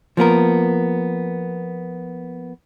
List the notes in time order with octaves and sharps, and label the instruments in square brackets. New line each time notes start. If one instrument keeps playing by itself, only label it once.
[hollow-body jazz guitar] F3 A#3 B3 A#4